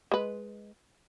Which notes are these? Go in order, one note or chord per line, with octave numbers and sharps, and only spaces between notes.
G#3 B4